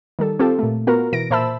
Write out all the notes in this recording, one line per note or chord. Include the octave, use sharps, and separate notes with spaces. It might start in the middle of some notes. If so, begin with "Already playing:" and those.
D#3 G3 A4
C4 F4 G4 A4
A#2 A3
B3 F4 F#4 A#4
B2 E3 A#6 D7
A#2 C5 E5 A5 B5 E6